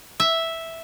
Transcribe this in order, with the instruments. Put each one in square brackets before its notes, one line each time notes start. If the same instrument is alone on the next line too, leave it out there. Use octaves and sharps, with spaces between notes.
[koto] E5